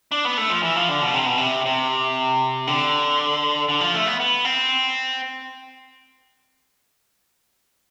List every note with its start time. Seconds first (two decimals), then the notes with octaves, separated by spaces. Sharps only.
0.12 D4
0.25 B3
0.38 A3
0.50 F3
0.63 E3
0.76 F3
0.89 D3
1.02 B2
1.14 C3
1.26 B2
1.37 C3
1.65 C3
2.67 D3
3.69 D3
3.81 F3
3.94 A3
4.07 B3
4.20 B3
4.45 C4